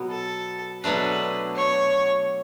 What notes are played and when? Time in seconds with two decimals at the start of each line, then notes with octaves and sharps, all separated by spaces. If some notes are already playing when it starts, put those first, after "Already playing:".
Already playing: B2 F#3 B3
0.10 A4
0.83 B2 F#3 A3 D4 B4
1.56 C#5